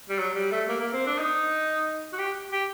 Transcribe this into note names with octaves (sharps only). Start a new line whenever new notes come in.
G3
F#3
G3
A3
A#3
A#3
C4
D4
D#4
F#4
G4
G4